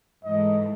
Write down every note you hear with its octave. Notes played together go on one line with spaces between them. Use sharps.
G#2 E3 A3 D#5